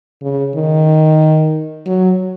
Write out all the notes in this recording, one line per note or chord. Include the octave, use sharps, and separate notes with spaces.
C#3
D#3
F#3